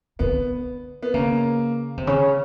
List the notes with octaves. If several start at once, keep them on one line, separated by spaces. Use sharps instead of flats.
D3 B3
B3
C#3 A#3
C3
C#3